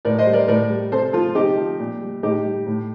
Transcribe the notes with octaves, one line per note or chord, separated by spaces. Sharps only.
A2 A#4 D5
C5 D#5
G3
A#4 D5
A2 A#4 D5
G3
C3 A4 C5
F3 F4 A4
C3 D#4 G4
F3
A#2
G3
A2 D#4 G4
G3
A2